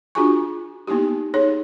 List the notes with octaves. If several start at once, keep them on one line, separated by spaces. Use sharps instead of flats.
D4 F4 F#4 G#4 G#5 C#6
A#3 B3 D#4 E4 G4
D#4 G#4 C#5